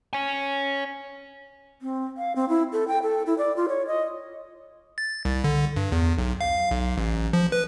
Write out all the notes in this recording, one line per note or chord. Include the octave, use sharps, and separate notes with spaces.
C#5 G#5
C4
F5
C4
E4
A4
G5
A4
E4
D5
F4
C#5
D#5
A6
C2
D3
G2
E2
B1
F5
B1
A1
F3
B4